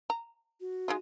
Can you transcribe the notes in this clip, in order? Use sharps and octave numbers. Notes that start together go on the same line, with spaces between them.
A#5
F#4
G#3 D#4 F4